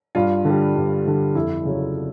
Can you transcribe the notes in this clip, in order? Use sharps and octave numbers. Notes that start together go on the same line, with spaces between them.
G2 F4
D3 G3
G2
D3 G3
F2 E4
C#3 F#3